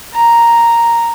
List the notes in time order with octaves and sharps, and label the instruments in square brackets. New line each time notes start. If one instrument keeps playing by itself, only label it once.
[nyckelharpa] A#5